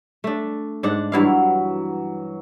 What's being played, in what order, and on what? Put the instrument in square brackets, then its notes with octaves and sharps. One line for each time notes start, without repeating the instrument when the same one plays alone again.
[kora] A3 D4
G#2 D4 F#5
[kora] G2 E4 F5 [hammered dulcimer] E3 F#3